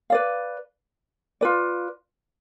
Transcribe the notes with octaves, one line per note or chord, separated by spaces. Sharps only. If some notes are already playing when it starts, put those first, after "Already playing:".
B4 D5 F5
F4 B4 D5